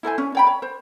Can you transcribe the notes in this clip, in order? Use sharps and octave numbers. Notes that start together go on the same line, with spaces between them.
E4 A4 C5 G#5
C#4
C#5 G5 B5
C#5
C5